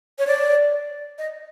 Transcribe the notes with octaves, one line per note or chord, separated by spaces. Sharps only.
C#5
D5
D#5